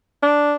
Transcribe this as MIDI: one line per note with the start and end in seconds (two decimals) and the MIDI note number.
0.23 0.56 62